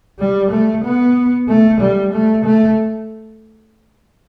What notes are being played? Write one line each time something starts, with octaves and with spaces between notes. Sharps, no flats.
G3
A3
B3
A3
G3
A3
A3